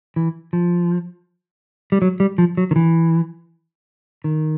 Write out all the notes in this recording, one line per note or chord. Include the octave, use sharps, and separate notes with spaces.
E3
F3
G3
F#3
G3
F3
F#3
D#3
E3
D#3